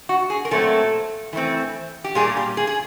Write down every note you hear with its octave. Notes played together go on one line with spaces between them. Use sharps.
F#4
G#4
A#4
A#2 F#3 A3 C4 A4
E3 A3 C4
G4
A#2 G3 A#3 G#4
G4
G#4
G#4